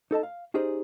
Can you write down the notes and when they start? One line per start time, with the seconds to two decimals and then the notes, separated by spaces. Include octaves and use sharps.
0.11 D#4 A4 D#5 A5
0.23 F5
0.54 C#4 D#4 G4 G#4 C5 D5